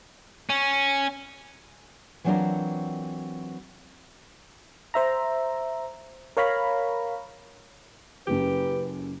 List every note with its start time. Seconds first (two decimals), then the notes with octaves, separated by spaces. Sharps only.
0.50 C#4
2.24 E3 F#3 C4 D4 F4 A#4
4.94 C5 E5 A#5
6.37 A#4 C#5 F5 A#5 B5
8.27 F#1 F#2 G4 B4